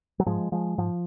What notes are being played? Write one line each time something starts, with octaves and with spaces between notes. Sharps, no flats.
F#3
G#2 F3 G#3
F3 G#3
G#2 F3